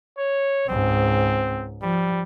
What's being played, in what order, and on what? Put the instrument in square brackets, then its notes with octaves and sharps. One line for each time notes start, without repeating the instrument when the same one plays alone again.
[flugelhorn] C#5
[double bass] C#2 G#2 [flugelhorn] C4
[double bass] F3 [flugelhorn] G3